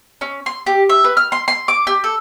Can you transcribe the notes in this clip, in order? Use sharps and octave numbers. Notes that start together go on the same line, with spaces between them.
C#4
C6
G4
E5
B4
F6
C6
C6
D6
G4
A4